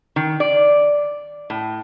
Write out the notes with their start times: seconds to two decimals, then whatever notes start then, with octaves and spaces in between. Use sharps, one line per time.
0.16 D#3
0.40 D5
1.50 A2